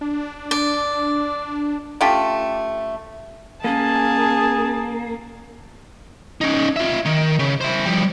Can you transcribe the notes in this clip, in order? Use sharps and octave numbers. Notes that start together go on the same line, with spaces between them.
D4
D5
A3 C#4 F4 G4
A#3 C#4 G#4 A5
C#4 D#4
F4 E5
D#3
C#3
E4 C5
F3 G3